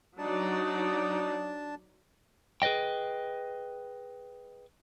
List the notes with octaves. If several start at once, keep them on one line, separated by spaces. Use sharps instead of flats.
F#3 D4 D#4 D5 A5
G#4 B4 D5 D#5 G5